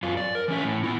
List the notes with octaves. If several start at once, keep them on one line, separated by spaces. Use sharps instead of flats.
F#2 F4
D5
A#4
E3 C#4 E5
A2
B3 E4